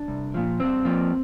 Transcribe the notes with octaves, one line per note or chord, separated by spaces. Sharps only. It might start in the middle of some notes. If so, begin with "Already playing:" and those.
Already playing: D4
C2
A#2 F3
G2 C4
F3 A#3